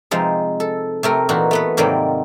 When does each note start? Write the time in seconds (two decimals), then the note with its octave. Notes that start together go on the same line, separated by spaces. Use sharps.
0.11 C3 F3 G#3 D#4
0.60 A4
1.03 C3 A3 A#4
1.29 A#2 E3 D#4 F#4
1.51 A3 B3 B4
1.77 G#2 C3 D#3 F#3 G3 A#3